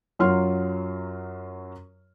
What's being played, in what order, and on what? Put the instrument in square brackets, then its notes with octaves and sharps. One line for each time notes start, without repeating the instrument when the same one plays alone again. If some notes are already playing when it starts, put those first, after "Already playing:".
[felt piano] F#2 F#3 F4 C6 F6